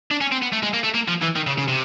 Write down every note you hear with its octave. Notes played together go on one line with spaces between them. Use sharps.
D4
C#4
C4
B3
A3
G#3
A#3
A3
A#3
F3
E3
D#3
C#3
C#3
C3